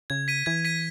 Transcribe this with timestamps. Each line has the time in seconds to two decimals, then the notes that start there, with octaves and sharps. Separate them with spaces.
0.10 C#3 G#6
0.28 B6 D#7
0.46 E3 G#6
0.65 B6 D#7